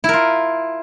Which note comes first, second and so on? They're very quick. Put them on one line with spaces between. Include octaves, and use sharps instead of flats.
E4 A#4 F4